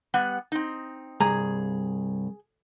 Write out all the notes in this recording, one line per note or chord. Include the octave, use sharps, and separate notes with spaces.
G3 B3 F#5
C4 D#4
C2 G2 G#4 A#5